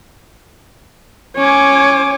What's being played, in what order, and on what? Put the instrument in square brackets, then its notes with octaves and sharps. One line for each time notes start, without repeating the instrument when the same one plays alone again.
[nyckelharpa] C#4 D6 [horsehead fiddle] C#5 G#5